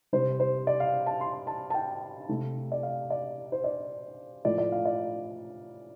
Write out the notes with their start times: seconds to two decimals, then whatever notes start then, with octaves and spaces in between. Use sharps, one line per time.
0.13 C3 G3 C5
0.40 C5
0.67 D5
0.80 F5
1.06 A5
1.21 C6
1.47 A5
1.70 A5
1.74 G5
2.29 C3 A3
2.72 D5
2.83 F5
3.10 D5
3.52 C5
3.64 D5
4.45 A2 F3 A3 D5
4.58 D5
4.72 F5
4.85 D5